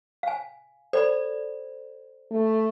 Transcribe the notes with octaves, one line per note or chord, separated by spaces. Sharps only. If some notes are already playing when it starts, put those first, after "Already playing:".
F5 G#5
A4 C5 D5 B5
A3